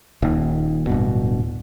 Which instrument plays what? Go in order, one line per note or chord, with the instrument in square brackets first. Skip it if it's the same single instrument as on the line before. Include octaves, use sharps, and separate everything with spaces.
[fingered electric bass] D#1 D#2
D1 G2 B2